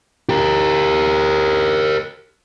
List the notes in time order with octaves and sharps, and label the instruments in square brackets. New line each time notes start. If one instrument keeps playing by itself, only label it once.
[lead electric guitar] G4 A#4